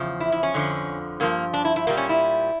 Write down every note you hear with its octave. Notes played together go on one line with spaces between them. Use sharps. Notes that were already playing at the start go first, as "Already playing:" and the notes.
Already playing: E2 C#3 F3
E4
E4
C#4
F2 D3 F3
G2 F3 A#3
D4
E4
E4
A#2 G3 A#3
C#4
E4